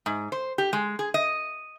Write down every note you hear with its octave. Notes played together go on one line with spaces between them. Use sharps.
G#2
C5
G4
G#3
G#4
D#5